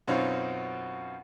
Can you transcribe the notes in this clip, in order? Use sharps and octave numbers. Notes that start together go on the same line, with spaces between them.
F#2 B2 C4 C#4 D#4 F4